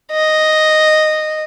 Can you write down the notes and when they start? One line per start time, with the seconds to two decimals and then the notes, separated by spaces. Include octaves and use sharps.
0.12 D#5